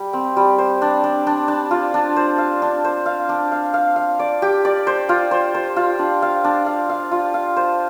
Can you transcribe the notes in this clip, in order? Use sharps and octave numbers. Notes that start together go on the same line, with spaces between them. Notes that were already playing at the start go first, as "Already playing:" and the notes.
Already playing: G3 G4
C4
G3
C5
D4
D4
D4
D4
F4
D4
C5
F5
D4
C5
F5
D4
F5
F5
F5
D5
G4
D5
C5
F4
C5
C5
F4
D4
F5
D4
F5
F5
F4
F5
C5